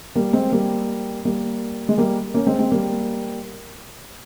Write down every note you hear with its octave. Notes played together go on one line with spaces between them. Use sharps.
G3 A#3
G#3 C4
G3 A#3
G3 A#3
G#3
G3 A#3
A#3 C#4
G#3 C4
G#3 C4
G3 A#3